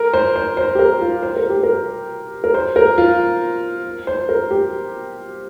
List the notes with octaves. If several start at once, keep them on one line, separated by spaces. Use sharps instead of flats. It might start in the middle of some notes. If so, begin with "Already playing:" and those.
Already playing: A#4
C5
C5
C5
G4
A#4
F4
C5
A#4
G4
A#4
A#4
C5
A#4
F4
C5
A#4
G4